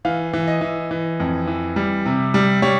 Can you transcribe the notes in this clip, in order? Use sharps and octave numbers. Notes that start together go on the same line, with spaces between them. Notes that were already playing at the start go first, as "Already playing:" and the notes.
E3 F5
E3
D#5
E3
E3
F2
E3
G3
C3
G3
G3 C#5